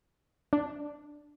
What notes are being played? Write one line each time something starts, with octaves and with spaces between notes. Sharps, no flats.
D4